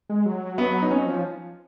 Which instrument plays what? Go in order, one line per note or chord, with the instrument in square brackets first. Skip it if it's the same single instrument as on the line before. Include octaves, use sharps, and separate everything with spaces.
[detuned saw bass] G#3
F#3
[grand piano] B3
D#4
[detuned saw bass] F#3 [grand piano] C#4
[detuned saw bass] F3